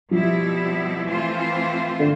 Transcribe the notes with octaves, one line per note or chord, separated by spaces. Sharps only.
B2 F3 G3 C4 E4
E3 A3 C4 F4 C5
D3